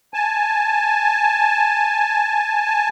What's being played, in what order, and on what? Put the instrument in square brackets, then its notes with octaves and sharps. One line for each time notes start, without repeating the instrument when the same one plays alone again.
[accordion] G#5 A5